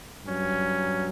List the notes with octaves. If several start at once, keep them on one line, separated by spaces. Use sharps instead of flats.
G2 F#3 C#4